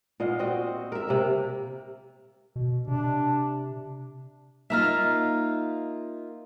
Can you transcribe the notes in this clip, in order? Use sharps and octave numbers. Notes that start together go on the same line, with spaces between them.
A#2 D#5 F5 F#5
C4 F#4 D#5 G5
A#4 E5
C3 A#3
B2
C3 D4
A#3 D#4 F4 E5 A#5 F6